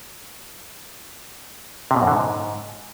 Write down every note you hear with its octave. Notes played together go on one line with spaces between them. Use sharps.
C3
B2
F#2
D3
G#2